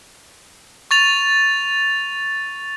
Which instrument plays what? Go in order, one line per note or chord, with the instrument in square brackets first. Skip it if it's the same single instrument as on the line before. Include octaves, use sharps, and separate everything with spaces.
[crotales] C#6 A6 F7